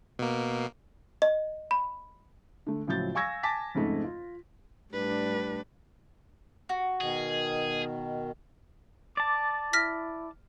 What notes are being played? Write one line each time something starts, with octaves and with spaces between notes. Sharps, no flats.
B2 A#3
D#5
B5
D3 A3
C#2 A2 F3 F#3 G6 A6
F5 G#5 C#6 E6 G#6 A#6
G#5 A5 D6 A6 B6
F2 G#2 C#3 A3
F4
A2 G3 D4 B4
F#4
B2 D#3 G#4
D5 A5 D6
E4 F6 A#6 B6